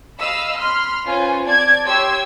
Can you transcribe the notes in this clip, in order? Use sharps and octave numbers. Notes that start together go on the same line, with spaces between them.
D#5 F5 B5 E6
B5 C6 F6
C#4 F4 B4 C5 G#5
C4 D5 A5 G#6
G4 C#5 C6 E6 G#6